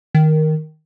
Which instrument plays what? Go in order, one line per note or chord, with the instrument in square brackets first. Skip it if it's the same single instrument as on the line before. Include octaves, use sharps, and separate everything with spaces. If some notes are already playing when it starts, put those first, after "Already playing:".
[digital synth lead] D#3